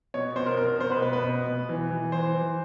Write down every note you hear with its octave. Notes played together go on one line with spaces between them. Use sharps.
B2 C#5
B2 C5
A#4
B2 A#4
A#4
B2 C5
B4
B2 B4
B4
B2
B2
E3
E3
E3 C5
E3